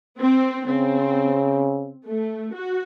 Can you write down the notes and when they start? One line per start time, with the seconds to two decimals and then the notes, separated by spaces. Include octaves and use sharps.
0.20 C4
0.67 C#3 C4
2.06 A3
2.54 F#4